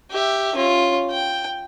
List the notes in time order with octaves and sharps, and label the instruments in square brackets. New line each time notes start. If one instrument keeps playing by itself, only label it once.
[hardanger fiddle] G4 E5
C#4 F4
G5